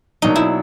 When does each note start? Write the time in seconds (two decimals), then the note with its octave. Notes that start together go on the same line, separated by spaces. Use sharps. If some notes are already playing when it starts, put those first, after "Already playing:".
0.22 B2 F#3 A#3 D4 D#4
0.36 E4